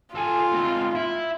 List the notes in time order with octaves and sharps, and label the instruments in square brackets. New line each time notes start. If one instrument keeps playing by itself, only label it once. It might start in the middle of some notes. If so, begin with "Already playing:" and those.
[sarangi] F4 [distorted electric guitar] A4 G#5
[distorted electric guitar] C4 D#4
E4